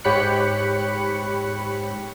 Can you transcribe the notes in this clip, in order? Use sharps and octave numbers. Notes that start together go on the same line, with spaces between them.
G#2 G4 C#5 B5 F#6 C#7